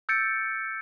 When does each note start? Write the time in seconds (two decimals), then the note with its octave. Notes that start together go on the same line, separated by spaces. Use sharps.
0.09 E6 G6 A6 C#7 D7